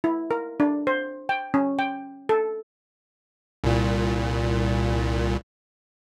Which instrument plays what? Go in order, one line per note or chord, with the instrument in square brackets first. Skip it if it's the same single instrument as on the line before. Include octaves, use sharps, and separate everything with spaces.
[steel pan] E4
A#4
D4
C5
G5
C#4
G5
A4
[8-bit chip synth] C2 A#2